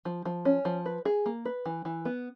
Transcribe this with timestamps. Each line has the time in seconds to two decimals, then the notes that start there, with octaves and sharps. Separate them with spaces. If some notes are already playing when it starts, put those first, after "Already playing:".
0.05 F3
0.25 F3
0.45 C#4
0.65 F3
0.86 B4
1.05 G#4
1.26 A#3
1.45 B4
1.66 E3
1.85 E3
2.05 B3